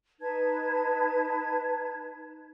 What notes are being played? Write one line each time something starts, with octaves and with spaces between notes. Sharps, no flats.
D#4 B4 A5 G#6